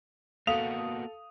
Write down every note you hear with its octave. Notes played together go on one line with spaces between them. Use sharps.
A#3 B3 F#4 A4 F5 D#6 F7